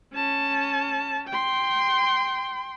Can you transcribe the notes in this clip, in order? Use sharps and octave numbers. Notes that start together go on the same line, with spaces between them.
C#4 A5
G5 C6